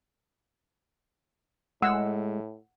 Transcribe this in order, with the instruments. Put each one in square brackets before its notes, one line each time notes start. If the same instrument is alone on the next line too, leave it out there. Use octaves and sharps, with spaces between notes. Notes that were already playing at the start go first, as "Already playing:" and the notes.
[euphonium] A2 [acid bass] G#3 [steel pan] F#5 E6